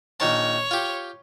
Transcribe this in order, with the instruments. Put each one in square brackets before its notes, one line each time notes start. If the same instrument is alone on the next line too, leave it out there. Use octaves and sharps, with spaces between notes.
[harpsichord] A#1 D#3 A5 [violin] C#5
[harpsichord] F4 G4